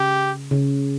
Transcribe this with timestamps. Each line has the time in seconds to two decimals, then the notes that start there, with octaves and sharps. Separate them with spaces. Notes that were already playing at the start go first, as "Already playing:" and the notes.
Already playing: C#3 G4
0.51 C#3